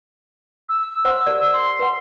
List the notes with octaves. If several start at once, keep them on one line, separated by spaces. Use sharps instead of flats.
E6
C5 F#5 C6 E6
G4 A#4 D5
C6
B4 F#5